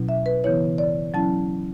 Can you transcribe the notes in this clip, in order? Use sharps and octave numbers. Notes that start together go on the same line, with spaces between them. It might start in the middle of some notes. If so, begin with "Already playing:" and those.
Already playing: B2 F#3 C#4 E4
E5
B4
C#3 E3 B3 E4 C#5
D5
F#3 C#4 E4 A5